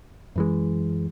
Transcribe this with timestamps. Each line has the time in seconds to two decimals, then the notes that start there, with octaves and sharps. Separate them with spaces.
0.36 F#2 E3 G#3